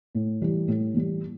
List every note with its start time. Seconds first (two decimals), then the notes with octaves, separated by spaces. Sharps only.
0.15 A2
0.42 E3 G3
0.68 A2
0.94 E3 G3